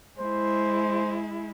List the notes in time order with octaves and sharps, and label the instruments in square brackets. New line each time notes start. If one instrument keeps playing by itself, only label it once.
[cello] G#3 E4 [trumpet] C5